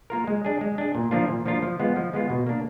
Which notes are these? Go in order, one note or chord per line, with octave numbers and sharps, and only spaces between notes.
A#3 F4 A#4
G#3
D4 G#4
G#3
D4 G#4
A#2
F3 A#3 D4 F4
A#2
F3 A#3 D4 F4
F3
G#3 B3 F4
F3
G#3 B3 F4
B2
A#3 D4